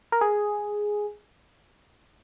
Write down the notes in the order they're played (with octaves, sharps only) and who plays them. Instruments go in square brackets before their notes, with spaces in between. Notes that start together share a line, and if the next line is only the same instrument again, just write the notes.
[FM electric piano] A#4
G#4